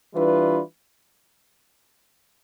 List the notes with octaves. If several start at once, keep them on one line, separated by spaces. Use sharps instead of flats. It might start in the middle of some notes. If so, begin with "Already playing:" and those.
E3 G3 D4 F4 B4